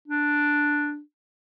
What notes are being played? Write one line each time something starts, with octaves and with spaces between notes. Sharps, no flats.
D4